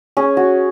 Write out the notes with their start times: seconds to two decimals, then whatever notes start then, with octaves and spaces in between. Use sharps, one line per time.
0.17 C#4 G#4
0.37 F#4